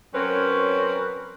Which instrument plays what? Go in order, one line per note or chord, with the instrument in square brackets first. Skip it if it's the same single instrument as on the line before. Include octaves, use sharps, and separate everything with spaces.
[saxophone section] F#3 C4 C#4 A#4 B4 C#5